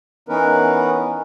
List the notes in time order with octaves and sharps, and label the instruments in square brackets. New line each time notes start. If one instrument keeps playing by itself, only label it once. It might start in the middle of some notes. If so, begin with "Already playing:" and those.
[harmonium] E3 B3 C#4 D#4 A#4 B4